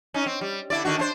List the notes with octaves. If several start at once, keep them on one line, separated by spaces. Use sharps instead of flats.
C#4 D#4
C4
G3
D3 E4 D5
D3 D#3 F#4
D4 D#4 C5